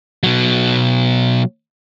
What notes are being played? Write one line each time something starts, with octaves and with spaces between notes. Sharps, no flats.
B2 F#3